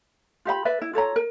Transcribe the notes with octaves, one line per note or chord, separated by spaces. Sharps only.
F4 G4 F5 B5
B4 D5 E5
E4
F4 A4 C#5 A#5
A#4